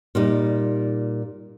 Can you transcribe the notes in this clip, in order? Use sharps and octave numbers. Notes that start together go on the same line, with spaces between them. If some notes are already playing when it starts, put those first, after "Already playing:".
A#2 G3 D#4